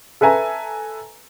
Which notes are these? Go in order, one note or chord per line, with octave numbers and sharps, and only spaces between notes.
A4 B4 E5 G#5 A#5